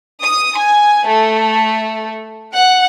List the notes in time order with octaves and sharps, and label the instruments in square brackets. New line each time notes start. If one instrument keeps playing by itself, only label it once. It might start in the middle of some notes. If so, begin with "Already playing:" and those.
[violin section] D#6
G#5
A3
F#5